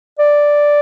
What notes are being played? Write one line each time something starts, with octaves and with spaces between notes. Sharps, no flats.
D5